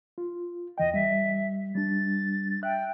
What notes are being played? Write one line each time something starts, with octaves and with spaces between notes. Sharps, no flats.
F4
E2 E3 D#5 G5
G3 E5
G3 D4 A6
E5 G5 F#6